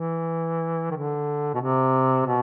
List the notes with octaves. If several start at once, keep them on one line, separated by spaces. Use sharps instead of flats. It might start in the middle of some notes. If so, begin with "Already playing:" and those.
Already playing: E3
D#3
D3
B2
C3
B2